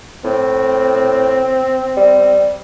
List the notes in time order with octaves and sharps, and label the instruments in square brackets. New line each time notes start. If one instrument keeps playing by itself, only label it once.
[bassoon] A2 [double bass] C4
[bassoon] G3